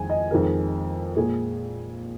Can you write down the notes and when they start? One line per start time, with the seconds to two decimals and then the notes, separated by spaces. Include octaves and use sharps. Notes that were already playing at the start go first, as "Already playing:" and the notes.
Already playing: F2 D#3 G#3 G#5
0.10 D#5
0.31 F2 D#3 G#3 A#4
1.16 A#2 G#3 G#4